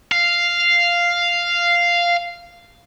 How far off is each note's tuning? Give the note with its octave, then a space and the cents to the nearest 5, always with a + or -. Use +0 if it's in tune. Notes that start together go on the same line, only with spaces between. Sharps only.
F5 -5